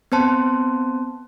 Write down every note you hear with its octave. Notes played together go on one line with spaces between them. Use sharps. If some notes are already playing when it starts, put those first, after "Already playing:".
B3 C4 C5 A5 C6